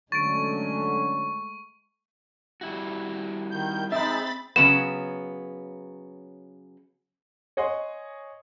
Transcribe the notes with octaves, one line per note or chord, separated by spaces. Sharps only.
D3 F#3 G#3 A3 C#4 C#6 A6 D7
G3 E4 F#4
D#3 G6
G#3 C4 D#4 E5 B5 A6
C#3 F#3 B3 E7
C#5 D#5 F#5 G#5 C6